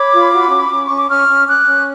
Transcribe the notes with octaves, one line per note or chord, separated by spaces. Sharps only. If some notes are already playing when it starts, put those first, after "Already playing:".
Already playing: C#5 B5 D6
F4
F#4
C#4
C#4
B5
C#4 C#6
D6
C#4 C#6 F6
C#4
C#4 D6 F#6
C#4